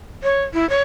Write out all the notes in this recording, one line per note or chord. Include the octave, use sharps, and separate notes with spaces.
C#5
E4
C#5